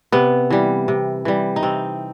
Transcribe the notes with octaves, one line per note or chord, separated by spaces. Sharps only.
C3 B3
E3 G3
C3
E3 G3
D#4
C3 C4